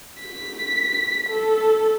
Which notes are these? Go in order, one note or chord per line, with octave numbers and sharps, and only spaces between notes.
B6
A4